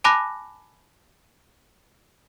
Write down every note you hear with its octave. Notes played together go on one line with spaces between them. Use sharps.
G#5 A5 B5 D6 F#6 A#6